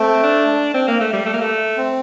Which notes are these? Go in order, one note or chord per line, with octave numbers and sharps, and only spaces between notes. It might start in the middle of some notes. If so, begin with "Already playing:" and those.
Already playing: A3 C4
D4
C4
A#3
A3
G3
A3
A#3
A3
C4